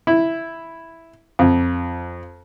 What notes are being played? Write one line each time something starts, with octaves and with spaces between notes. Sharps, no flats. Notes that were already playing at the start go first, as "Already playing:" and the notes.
E4
F2